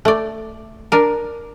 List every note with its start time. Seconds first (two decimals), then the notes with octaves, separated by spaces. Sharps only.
0.05 A3 D5
0.92 D4 A#4